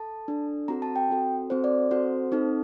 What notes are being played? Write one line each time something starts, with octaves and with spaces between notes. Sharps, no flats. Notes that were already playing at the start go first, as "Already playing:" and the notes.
Already playing: A4 A5
D4 A4
C4 F#4 A4 A#5
A5
G5
C4 F#4 A4
C4 F#4 A4 C5
D5
C4 F#4 A4 C5
C4 D#4 A4